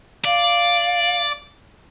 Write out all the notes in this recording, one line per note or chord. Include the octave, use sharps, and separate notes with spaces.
D5 F5